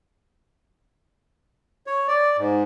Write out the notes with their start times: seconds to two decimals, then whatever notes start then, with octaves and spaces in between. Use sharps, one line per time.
1.87 C#5
2.08 D5
2.37 G#2